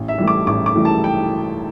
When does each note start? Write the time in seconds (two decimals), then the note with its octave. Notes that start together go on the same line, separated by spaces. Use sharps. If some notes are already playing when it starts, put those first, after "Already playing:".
Already playing: A1
0.08 E5
0.18 A2 E3 G3
0.28 D6
0.47 A1 D6
0.66 D6
0.75 A2 E3 G3
0.85 A5
1.04 G5